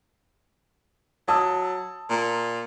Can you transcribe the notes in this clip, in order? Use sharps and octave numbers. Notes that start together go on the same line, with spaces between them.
F#3 A5 D#6 E6
A#2